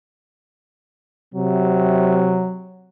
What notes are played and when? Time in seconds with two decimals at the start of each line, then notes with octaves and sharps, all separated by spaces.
1.35 C3 F#3